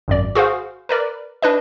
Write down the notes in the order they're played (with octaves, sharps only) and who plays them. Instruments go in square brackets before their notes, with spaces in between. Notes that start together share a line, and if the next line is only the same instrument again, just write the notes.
[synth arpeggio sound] G#1 F#2 D5
F#4 G#4 C5 F5
A#4 B4 D5
D4 B4 D#5